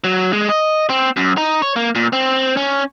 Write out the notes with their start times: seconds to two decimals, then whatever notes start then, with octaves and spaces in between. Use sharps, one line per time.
0.04 F#3
0.33 G#3
0.49 D#5
0.90 C4
1.17 F#2
1.37 D#4
1.62 C#5
1.76 A#3
1.95 A#2
2.13 C4
2.57 C#4